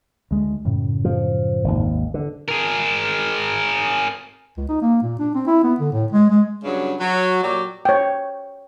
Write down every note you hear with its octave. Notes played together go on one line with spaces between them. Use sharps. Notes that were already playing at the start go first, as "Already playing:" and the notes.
D2 G#3
F#2 A2 C#3
F3
G#1 D#2
D3
G#4 A#4
C#2
D#4
A#3
A#2
D4
C4
E4
B3
D3
A2
G#3
G#3
G2 C#3 F#3 D4
F#3
A#2 F#3 G4 D5
C#5 G5